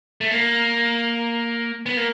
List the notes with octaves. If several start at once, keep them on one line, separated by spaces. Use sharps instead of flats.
A3
A#3
B3
A#3